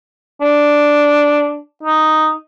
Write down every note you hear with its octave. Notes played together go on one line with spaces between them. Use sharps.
D4
D#4